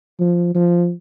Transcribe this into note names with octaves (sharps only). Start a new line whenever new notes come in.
F3
F3